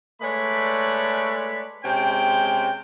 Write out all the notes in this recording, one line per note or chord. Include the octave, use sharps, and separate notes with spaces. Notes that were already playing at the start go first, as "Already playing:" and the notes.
G#3 A3 B4 C#5 D5 B5
C3 G#3 C#4 G5